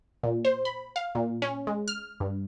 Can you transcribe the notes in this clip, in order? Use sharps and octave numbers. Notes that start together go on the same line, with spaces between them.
A#2
C5
B5
F5
A#2
C#4
G#3
F6
G2